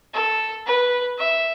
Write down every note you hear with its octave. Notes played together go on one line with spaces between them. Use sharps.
A4
B4
E5